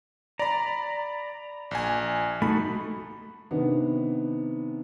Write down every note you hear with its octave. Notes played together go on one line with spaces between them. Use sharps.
D5 A#5 B5
A#1 G#5
A3 D#4 F#4 B5
C3 D#3 B3 D4